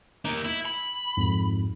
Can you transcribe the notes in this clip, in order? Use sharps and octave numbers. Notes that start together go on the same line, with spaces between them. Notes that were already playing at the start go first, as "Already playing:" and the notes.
A#3 D#4
E4
B5
F2 G#2